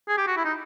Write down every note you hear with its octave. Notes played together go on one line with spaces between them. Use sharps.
G#4
G4
F#4
E4
D#4